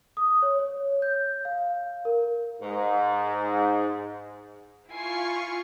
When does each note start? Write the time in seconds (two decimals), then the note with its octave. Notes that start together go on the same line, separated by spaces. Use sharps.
0.17 D#6
0.42 C#5
0.59 C#5
1.02 G6
1.45 F5
2.05 A#4
2.62 G#2
4.89 E4 F4 G#5 C#6 C7